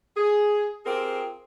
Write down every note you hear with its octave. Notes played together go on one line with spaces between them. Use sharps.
G#4
C4 F4 G4 G#4 A#4